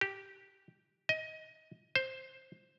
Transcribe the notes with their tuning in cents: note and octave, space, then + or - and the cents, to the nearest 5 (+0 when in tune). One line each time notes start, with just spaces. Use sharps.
G4 -10
D#5 +20
C5 +5